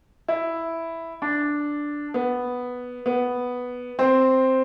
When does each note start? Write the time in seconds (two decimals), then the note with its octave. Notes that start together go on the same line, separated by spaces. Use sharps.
0.28 E4
1.22 D4
2.14 B3
3.06 B3
3.99 C4